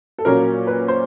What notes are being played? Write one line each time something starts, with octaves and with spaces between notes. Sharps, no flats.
A4
A#2 F#3 A#3 C#4 A#4
B4
C5